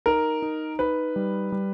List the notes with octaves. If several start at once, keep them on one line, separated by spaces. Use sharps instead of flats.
D#4 A#4
D#4
D#4 B4
G3
G3